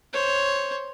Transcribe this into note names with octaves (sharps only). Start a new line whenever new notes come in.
C5 C#5